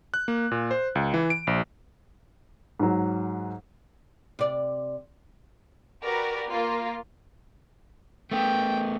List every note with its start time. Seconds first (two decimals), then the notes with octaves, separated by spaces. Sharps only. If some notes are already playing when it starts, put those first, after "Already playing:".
0.14 F#6
0.28 A#3
0.51 A#2
0.71 C5
0.95 C#2
1.14 E3
1.30 D7
1.47 A#1
2.80 G#2 F#3
4.39 C3 D5
6.04 F#4 G4 A#4 B4 D5
6.49 A#3 F4
8.31 A3 B3 G5